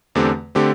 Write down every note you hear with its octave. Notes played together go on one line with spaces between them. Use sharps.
E2 D3 A3 C4 G4
D3 A3 C4 G4